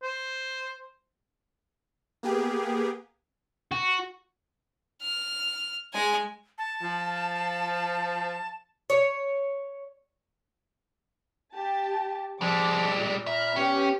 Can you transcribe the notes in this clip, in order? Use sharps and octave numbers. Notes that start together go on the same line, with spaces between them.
C5
A#3 B3 G4 G#4
F#4
F6
G#3 G#5
A5
F3
C#5
G4 A5
F3 G3 G#3 D6 E6
A#2
E5 A#5 B5 F6
B3 C#4 G4